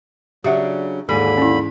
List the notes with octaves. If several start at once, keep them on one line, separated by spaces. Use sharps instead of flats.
C#3 F#3 D4 G4 E5 F#5
D#2 G#2 D3 E3 G#4 A4 B5
C#4 E4